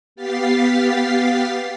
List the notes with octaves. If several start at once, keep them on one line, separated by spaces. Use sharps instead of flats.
B3 G4 F5 A6 B6 C7